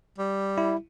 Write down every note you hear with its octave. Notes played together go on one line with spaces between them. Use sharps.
G3
E4